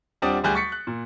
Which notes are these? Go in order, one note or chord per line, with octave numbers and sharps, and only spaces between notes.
D#1 G3 C4 D4 F#5 D#6
D1 D2 G3 G#4 F#6 G6
C#6 A6 B6 C#7
F#6
A#2